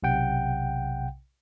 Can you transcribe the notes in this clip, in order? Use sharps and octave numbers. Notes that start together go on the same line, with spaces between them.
B1 C3 F#5 G5